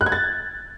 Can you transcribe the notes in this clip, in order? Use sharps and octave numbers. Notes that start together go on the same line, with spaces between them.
F#6
G#6
A6